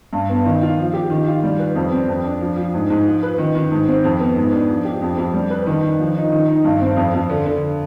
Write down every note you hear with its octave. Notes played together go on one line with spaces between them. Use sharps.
G2
B3
D#3
F4
F3
G4
D#3
F4
G3
B4
F2
C4
F2
D4
F3
F3
G#2
G#2
F3
B4
D#3
D#3
G#2
C4
F2
B3
G#2
D4
F3
G4
F2
F2
G3
B4
D#3
D#3
F3
D#4
D#3
D#4
G2
C4
F2
F2
D3
D3